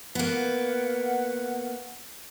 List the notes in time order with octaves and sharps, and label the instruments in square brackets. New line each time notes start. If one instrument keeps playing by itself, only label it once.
[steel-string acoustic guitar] A#3 B3 [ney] F#5